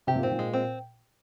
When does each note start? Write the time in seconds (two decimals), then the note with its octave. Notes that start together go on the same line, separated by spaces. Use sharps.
0.07 C3 G4
0.16 A#2
0.23 G#2 C4
0.32 A#2
0.39 G#3
0.54 C4